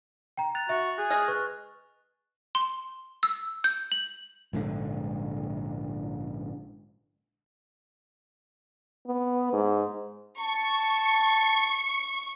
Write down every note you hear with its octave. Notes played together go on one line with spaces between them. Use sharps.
G5 A#5
F#6 A6 F7
F#4 E5
G#4 F#6
G#3 F6 A#6
B4 C#6 F#6
C6
E6
G6
F#7
A#1 G#2 D3
B3
G#2
A5 C#6